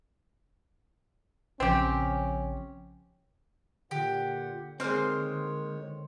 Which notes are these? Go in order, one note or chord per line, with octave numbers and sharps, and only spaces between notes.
A#1 C#3 F3 C4 C#4 G4
A#2 D3 G4 F#5
D#3 G#3 A#3 C4 C5 C#5 F6